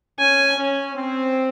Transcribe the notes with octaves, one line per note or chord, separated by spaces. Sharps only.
C#4 G#5
C#4
C4